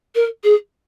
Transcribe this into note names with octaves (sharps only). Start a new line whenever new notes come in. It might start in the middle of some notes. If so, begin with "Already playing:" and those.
A#4
G#4